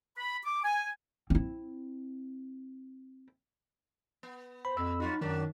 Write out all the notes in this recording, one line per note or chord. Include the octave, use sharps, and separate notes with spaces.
B5
D6
G#5
C4 E4
B3
C5 B5
F2 A#2 E6
F#3 D#4 F4 F#4
F#2 D#3 F#3 D4